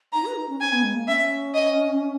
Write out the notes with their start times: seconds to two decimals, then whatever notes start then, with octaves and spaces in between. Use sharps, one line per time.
0.13 D#4 A#5
0.25 B4
0.36 D#4
0.49 C#4
0.60 C#4 G#5
0.72 B3
0.83 G#3
0.95 A#3
1.08 C#4 E5
1.54 D#5